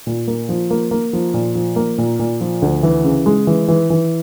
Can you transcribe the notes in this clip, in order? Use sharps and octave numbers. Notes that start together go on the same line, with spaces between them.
A#2
A#3
F3
A#3
A#3
F3
A#2
F3
A#3
A#2
A#2
F3
D2
E3
C#3
G#3
E3
E3
E3